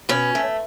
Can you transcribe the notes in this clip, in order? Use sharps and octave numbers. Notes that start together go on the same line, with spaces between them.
B2 C#4
A3